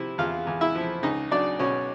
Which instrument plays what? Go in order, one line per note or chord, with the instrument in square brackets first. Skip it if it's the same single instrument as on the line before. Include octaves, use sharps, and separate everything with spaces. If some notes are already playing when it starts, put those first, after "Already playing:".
Already playing: [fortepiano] C3 F3 E4
E2 F4 F5
E2
E4 E5
F3
C#2 D#4 D#5
F#3 D4 D5
B2 C#4 C#5